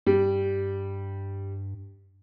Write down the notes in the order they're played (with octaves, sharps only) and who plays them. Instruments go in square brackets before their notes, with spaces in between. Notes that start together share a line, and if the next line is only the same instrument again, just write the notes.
[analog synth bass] G2 [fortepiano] G3